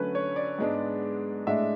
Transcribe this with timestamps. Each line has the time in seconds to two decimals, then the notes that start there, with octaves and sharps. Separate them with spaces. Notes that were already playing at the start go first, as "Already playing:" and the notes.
Already playing: D3 F#3 A3 C#4 B4
0.15 C#5
0.36 D5
0.59 G#2 G#3 B3 D4
1.47 A2 G#3 D4 E5